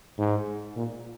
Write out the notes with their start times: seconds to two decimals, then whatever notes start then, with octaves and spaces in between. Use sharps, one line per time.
0.18 G#2
0.76 A#2